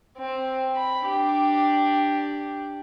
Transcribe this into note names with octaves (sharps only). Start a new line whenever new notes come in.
C4
B5
D4 G4